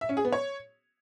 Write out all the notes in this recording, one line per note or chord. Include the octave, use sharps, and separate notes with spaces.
E5
C#4
G#4
B3
C#5